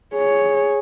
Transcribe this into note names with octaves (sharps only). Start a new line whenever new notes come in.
G#4 C#5